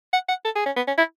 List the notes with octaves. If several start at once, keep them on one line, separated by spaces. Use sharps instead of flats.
F#5
F#5
A4
G#4
C#4
B3
C#4
E4